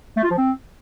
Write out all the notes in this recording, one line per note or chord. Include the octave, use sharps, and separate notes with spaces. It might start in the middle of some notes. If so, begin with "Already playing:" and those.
A3
F4
F3
C4